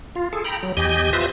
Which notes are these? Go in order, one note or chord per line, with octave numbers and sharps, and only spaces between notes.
F4
G#4 A4
G5 A#5 B5
F#3
E2 G4 D#5 G#5 G6
F4 B4 C5 E5 A#6